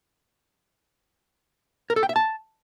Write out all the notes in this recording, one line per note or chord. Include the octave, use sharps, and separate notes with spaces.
A#4
A4
G5
E5
A5